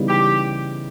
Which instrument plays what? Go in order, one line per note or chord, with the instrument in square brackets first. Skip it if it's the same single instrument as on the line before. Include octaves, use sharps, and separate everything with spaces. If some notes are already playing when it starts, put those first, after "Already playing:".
Already playing: [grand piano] C#3 E3 G3 B3 D#4
[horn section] G4